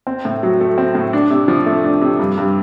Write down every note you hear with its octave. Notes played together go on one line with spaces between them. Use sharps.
C4
A2
F#3
A3
C4
A2
D4
C3
F3
A3
D4
C3
G2
G2